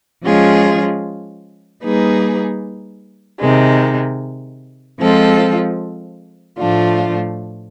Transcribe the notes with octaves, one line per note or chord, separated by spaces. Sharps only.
F3 G#3 C#4 F4 G#4
G3 A#3 D#4 G#4 B4
C3 D#3 G#3
F3 G#3 C4 F4 A4
A2 F3 A3 D4 F4